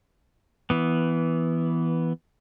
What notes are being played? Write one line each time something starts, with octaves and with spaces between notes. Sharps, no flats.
E3 B3